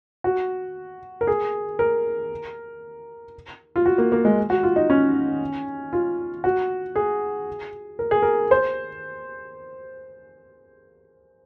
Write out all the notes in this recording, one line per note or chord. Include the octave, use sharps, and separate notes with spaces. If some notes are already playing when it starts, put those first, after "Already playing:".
F#4
A#4
G#4
A#4
F4
F#4
A#3
A#3
G#3
F#4
F4
D#4
C#4
F4
F#4
G#4
A#4
G#4
A#4
C5